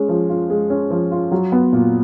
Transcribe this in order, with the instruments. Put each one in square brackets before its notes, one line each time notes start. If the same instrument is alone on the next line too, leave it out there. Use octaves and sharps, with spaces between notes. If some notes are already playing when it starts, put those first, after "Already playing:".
Already playing: [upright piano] G#3 C#4
F3
F4
G#3
C#4
F3
F4
F#3
B3
A#2